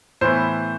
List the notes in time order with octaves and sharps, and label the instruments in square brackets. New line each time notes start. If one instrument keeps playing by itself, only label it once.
[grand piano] A2 E3 B3 C5